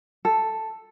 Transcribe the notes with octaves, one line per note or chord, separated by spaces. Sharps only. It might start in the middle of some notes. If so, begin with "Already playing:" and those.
A4